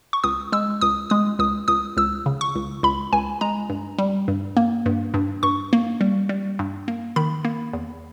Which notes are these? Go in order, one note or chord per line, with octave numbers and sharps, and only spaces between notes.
C#6
C#2 D#6
G#3 E6
C#2 D#6
G#3 D#6
C#2 D#6
C#2 D#6
C#2 E6
C#3
C#6
C#2
C#2 B5
C#2 G#5
G#3 A#5
G2
G3
G2
A#3
G2
G2
G2 C#6
A#3
G3
G3
G2
A#3
D#3 B5
A#3
E2